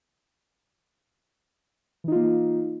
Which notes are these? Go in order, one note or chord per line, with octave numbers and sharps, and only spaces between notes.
E3 A#3 D#4 F4